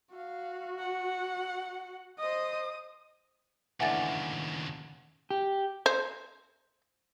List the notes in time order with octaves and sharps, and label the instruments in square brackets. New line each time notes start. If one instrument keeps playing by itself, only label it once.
[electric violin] F#4 [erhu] F5
[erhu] F#5
[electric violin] C5 D#5 [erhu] D#6
[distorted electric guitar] D#2 C#3 [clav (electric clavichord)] E3 A3 D4 [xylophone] F#5 G#5 A6
[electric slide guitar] G4
[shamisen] C5